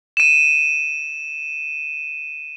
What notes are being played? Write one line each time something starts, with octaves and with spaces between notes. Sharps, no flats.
D#7 E7